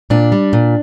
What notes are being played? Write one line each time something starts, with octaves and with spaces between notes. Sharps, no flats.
A#2 D4
G3
A#2